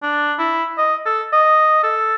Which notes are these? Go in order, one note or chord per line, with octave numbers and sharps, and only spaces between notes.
D4
E4
D#5
A4
D#5
A4